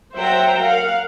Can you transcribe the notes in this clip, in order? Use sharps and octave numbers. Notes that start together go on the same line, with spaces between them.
F#3 C5 E5 F#5 G5 A#5
A#4 F5 F#5